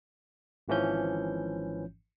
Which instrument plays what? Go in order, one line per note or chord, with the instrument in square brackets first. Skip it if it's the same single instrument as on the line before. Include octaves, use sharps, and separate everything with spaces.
[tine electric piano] G#1 G#2 E3 F3 C#4 G6